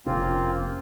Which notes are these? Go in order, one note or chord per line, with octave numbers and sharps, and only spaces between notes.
F1 C3 A#3 C4 C#4 F4